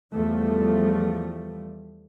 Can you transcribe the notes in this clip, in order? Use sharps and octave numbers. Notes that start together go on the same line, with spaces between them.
E2 F3 G3 A3